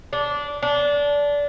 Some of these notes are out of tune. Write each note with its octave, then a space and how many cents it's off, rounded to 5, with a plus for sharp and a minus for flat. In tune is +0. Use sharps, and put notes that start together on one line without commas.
D4 -15
D4 -20